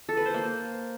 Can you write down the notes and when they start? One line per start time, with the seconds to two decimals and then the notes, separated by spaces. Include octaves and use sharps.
0.09 A4
0.17 B4
0.26 C5
0.34 A#3